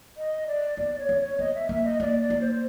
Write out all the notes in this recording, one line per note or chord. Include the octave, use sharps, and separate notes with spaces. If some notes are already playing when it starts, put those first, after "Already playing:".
D#5
D5
B3 D5
C#5
C4
C#5
B3 D#5
E5
A#3 E5
D#5
A#3 D5
D5
A#3
C5
C5